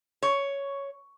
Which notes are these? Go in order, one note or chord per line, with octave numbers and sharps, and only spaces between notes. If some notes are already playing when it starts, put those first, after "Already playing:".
C#5